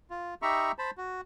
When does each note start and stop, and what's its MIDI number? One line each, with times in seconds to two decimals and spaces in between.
0.10 0.34 65
0.42 0.72 63
0.42 0.72 67
0.42 0.72 76
0.42 0.72 82
0.42 0.72 83
0.42 0.72 85
0.79 0.91 72
0.79 0.91 81
0.79 0.91 83
0.98 1.21 66